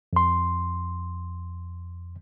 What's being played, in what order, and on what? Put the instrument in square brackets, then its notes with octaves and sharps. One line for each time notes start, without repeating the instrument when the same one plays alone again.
[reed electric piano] F2 C6